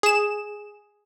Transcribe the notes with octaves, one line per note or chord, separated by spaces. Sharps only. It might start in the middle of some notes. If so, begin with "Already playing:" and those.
G#4 E7